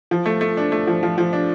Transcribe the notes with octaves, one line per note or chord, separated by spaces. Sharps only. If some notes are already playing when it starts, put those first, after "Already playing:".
F3
A3
A3
D4
A3
F3
F3
F3
D4